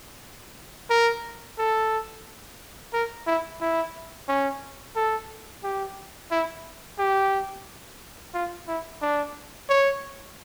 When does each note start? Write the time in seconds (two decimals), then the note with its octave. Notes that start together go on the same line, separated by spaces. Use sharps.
0.90 A#4
1.58 A4
2.93 A#4
3.27 E4
3.61 E4
4.28 C#4
4.96 A4
5.64 G4
6.31 E4
6.99 G4
8.34 F4
8.68 E4
9.02 D4
9.69 C#5